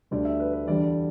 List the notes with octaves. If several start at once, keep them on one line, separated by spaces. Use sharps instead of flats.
D2 D3 G3 D5
E5
B4
B4
E2 D3 G3 D5